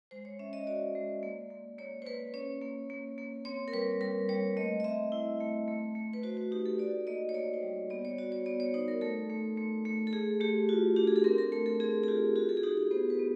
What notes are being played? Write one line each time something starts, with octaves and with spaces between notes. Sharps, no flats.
G#3 C5
C#5
C#4 E5
D#5
F#4 D5
G#3
A#3
A#3
A#3 C#5
C5
A#3 B4
C#4 C#5
A#3
A#3
A#3
C4 C#5
A#4
G3 B4
G3 A#4
G3 C#5
A3 D#5
D#5
C4 E5
E4
A3
A3
A3
B4
F#4 C5
F#4
D#4 G4
A4
F#4 D5
A#3 D#5
C#5
A#3 D5
C5
G3
B3 D5
C#5
F#4 D5
C#5
B3 D5
C#5
D#4 C5
A#4
A3 A4
A3
A3
A3
A4
A3 G#4
A3 G4
F4 F#4
D4 G4
G#4
A4
C4 A#4
A#4
A3 A#4
A4
C4 G#4
G#4
F4 G4
F#4 G#4
A4
G#4
D#4 G4
G#4
B3 C5
B4
B3